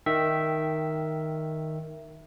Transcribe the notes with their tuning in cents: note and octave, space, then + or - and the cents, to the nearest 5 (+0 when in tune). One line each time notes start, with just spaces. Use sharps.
D#3 +0 E5 +0 G5 +0